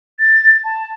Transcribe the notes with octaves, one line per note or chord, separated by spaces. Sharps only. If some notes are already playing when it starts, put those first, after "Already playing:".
A6
A5